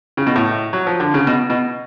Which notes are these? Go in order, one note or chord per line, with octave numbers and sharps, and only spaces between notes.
C#3
B2
A2
F#3
F3
D3
C#3
B2
B2